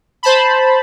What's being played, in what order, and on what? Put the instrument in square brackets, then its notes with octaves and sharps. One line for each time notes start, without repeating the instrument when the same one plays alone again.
[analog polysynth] C5 A5 B5